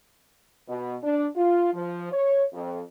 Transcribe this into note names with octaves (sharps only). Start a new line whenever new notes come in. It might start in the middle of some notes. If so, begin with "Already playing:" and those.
B2
D4
F4
F3
C#5
F2